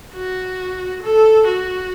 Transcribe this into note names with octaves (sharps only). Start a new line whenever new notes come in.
F#4
A4
F#4